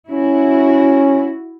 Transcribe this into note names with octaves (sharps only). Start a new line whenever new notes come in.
C#4 E4 F#4